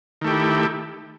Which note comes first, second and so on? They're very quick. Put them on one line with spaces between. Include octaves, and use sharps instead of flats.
D#3 A3 G4 E4